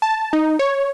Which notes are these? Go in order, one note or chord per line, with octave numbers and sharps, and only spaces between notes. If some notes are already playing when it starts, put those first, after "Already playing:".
A5
D#4
C#5